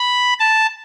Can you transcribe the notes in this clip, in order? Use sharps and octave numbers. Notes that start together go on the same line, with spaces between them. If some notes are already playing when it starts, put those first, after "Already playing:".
Already playing: B5
A5